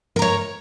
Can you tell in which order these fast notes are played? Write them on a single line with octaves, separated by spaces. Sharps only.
A#4 A#5 C#5